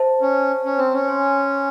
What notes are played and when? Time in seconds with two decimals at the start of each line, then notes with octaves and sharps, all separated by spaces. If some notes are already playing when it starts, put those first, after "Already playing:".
Already playing: C5 E5 A5
0.22 C#4
0.65 C#4
0.78 C4
0.94 C#4
1.08 C#5 G#5 C6